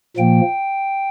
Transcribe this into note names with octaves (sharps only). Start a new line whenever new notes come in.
A#2 F3 A#3 G5